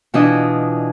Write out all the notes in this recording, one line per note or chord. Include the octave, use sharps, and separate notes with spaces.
B2 E3 D4 E4 F4 D#5